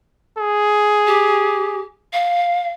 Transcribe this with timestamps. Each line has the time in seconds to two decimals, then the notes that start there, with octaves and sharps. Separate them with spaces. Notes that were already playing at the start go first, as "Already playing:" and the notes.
0.39 G#4
1.07 G4
2.13 F5